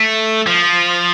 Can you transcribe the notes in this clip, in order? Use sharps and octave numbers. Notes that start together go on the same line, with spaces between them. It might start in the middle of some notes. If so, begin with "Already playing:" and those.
Already playing: A3
F3